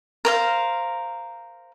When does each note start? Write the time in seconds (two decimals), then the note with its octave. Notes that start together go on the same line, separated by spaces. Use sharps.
0.25 A#4 C5 F5